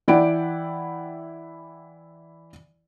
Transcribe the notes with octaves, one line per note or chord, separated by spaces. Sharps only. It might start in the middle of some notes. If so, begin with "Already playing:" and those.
E3 E4 D5 F#5 G5 D7